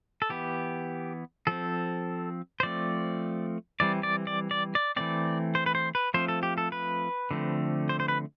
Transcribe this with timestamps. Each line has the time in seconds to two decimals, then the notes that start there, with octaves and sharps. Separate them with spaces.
0.22 A4
0.29 E3 B3 G4
1.47 F3 C4 A4
2.60 C5
2.63 F3 A3 C4 D5
3.80 E3 G3 C4 D5
4.03 D5
4.27 D5
4.51 D5
4.75 D5
4.96 E3 A3 C4 D5
5.55 C5
5.66 B4
5.75 C5
5.95 B4
6.14 F3 A3 C4 C5
6.28 A4
6.43 G4
6.58 A4
6.72 B4
7.31 D3 F3 A3 C4
7.89 C5
8.00 C5
8.08 B4